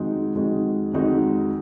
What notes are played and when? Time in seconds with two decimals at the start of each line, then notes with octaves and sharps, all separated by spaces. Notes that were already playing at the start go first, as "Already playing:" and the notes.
Already playing: F2 D#3 G#3 D#4 F#4
0.35 F2 D#3 G#3 D#4 F#4
0.93 F2 D#3 G#3 D#4 F#4